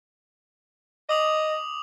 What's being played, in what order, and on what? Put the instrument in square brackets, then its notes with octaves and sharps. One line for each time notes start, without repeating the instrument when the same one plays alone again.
[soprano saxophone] D#5 [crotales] D6 D#6 F7